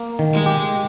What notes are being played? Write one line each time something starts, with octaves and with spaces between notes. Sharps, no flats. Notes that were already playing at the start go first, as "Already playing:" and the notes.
Already playing: A#3
D#3
G#3
G4